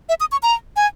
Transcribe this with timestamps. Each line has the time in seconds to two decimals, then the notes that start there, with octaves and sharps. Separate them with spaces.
0.09 E5
0.20 D#6
0.32 C#6
0.43 A#5
0.76 G#5